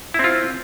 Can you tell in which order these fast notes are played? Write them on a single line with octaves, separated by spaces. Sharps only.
E4 C4 F4